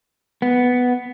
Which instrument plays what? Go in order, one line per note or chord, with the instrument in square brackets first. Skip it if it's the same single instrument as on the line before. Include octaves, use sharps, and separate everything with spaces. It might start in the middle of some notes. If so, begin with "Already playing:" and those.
[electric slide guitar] B3